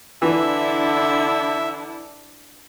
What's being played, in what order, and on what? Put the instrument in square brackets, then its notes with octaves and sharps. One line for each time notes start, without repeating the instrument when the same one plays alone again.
[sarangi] D3 [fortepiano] E3 [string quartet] D4 E4 [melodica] E5 E6